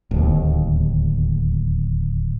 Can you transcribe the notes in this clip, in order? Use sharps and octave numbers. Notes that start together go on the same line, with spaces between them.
D1 D#2